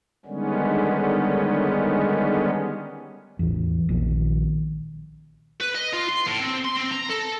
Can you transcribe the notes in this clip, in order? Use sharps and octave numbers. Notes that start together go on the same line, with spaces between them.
D3 D#3 G3 G#3 B3 C#4
A1 E2
A#1 D#3
B4
D#5
F4
C6
A2
C4
C6
C4
A#5
A4